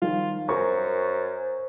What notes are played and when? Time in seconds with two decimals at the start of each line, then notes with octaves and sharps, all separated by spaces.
0.02 D#3 F3 G3 F4
0.49 F#2 A#4 C5 C#6